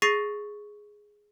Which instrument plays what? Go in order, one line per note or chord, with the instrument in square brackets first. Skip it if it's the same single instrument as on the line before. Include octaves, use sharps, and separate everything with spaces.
[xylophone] G#4 C#6 A6 A#6 C7 D#7